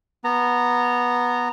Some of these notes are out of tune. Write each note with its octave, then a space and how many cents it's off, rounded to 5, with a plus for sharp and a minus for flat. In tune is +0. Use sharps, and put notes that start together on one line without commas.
B3 -10 A#5 -20